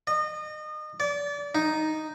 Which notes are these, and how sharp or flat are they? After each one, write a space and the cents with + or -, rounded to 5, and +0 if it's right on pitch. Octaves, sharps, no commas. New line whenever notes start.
D#5 -30
D5 -30
D#4 +0